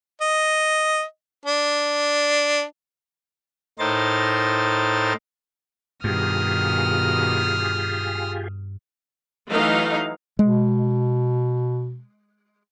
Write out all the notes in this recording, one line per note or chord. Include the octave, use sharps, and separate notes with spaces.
D#5
D4
A2 D#4 A#4 C5 A6
G2 B2 D#3 F4 G4 G#4 D#6 F6
E3 F#3 A3 D#4 F5
B2 G#3